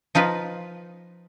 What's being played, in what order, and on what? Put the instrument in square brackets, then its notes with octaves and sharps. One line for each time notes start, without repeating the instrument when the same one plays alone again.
[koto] F3 D#4 F4 B4